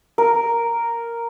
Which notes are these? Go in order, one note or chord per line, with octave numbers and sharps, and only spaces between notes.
A#4